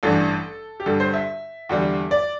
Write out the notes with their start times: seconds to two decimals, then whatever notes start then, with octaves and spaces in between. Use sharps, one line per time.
0.03 A1 G2 E3 A3 D4 A4
0.80 G4
0.86 G2 D3 G3 A4
1.00 C5
1.14 E5
1.69 E2 D3 G3
2.11 D5